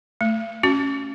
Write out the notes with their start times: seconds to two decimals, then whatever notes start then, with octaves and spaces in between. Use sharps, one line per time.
0.21 A3
0.63 C#4 F#4